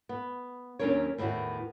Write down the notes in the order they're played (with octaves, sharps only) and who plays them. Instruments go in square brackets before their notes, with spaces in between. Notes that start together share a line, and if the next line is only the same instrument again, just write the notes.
[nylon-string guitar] B3
D#2 F#3 C#4 D4 A#4 C#5
E2 A2 D#3 E3 F#4